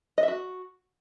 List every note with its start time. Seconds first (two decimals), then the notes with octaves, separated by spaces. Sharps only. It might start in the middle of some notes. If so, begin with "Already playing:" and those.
0.18 D#5
0.23 E5
0.28 F#4